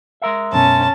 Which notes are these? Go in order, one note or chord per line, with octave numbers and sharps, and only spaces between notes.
G#3 A#4 E5
F#2 B2 C#4 A5